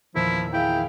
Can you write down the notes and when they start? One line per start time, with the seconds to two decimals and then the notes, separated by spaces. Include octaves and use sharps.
0.15 E2 A#2 D#3 F3 E4
0.53 E4 G#4 F5 G5